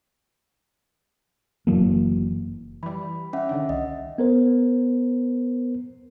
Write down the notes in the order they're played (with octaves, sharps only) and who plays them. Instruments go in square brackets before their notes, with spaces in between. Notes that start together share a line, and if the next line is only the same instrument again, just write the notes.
[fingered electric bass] F#1 E3 F#3 A#3
[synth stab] E3 G3 [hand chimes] B5
[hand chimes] C#4 E5 F#5
[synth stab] D3 D#3 D4
[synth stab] C2 [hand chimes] D#5
[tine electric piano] B3 A#4 C5